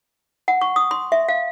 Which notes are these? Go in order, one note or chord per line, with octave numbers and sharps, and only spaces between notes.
F#5
C#6
D#6
C6
E5
F5